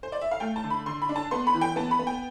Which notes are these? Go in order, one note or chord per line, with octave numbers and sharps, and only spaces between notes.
C5
D5
E5
F5
A3 G5
A5
D3
B5
D3 C6
B5
D4
A5
B3 C6
B5
E3
G5
B3 A5
B5
B3
G5